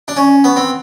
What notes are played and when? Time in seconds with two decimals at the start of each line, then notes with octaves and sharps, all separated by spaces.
0.08 D4
0.17 C#4
0.44 B3
0.56 C4